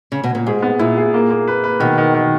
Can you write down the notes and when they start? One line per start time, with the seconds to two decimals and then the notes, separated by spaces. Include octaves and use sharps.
0.12 C#3
0.24 B2
0.35 A#2
0.47 G#2 G#4
0.62 B3
0.79 A#2 E4
0.97 G#4
1.14 A#3
1.30 A#3
1.48 B4
1.64 B4
1.80 B2 D#3
1.98 D#3
2.14 D#3